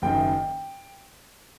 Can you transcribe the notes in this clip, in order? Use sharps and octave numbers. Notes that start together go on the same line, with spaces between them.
F#1 F#2 D#3 G5